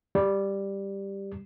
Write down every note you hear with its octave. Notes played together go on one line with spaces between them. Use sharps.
G3